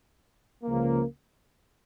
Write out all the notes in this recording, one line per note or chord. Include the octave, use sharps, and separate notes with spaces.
C#2 C#3 F3 A#3